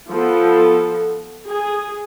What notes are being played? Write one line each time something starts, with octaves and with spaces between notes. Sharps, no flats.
F3 B3 A4
G#4